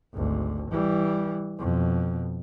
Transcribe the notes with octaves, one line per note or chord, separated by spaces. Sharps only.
G#1 D2
E3 G3
F2 B2